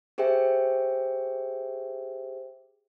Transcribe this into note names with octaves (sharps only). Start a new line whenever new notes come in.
G4 G#4 C5 E5 G5